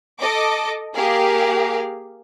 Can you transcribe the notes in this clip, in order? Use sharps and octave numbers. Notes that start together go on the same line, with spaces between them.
A4 D#5 D6
A#3 G4 G#4 A#4 F5